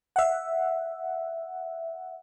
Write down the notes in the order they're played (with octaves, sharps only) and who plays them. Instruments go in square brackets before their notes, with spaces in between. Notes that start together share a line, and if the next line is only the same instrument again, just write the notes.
[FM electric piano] E5 F#5